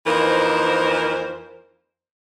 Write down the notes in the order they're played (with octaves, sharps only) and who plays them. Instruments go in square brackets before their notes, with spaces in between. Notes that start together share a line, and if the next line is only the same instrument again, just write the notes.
[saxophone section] F2 E3 A#3 D#4 A#4 C5